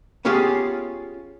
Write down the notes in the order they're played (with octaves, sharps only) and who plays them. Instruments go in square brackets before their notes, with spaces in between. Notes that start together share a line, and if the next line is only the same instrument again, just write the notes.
[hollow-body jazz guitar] B3 C#4 F4 G4 G#4